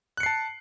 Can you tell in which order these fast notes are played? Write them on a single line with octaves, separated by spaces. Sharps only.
F#6 C#7 C7 A5